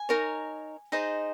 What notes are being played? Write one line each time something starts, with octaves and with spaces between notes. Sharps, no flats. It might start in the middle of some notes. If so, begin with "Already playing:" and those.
Already playing: G#5
D#4 A#4 C#5
D#4 G#4 C5 D#5